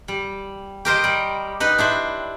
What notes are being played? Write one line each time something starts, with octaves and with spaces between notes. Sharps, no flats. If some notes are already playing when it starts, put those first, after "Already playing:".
G3
G4 A#4 C5 D#5
G3
D#4 B4
D4 E4 C5